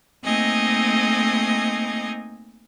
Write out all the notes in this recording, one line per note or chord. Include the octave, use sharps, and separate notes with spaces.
A3 A#3 C4 D#4 D#5 G#5